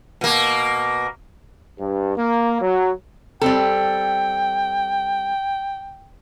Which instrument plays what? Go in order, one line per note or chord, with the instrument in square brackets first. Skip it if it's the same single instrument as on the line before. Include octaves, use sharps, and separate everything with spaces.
[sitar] B2 A#3
[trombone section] G2
A#3
F#3
[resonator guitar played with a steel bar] G3 C4 A4 [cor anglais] G5